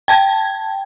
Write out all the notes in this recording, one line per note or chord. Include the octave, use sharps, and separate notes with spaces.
G5 A5 G#6